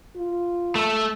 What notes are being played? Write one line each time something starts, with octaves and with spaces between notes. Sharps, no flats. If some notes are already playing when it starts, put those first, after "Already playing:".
F4
A3